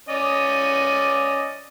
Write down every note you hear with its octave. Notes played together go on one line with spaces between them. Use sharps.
C#4 D5 D#5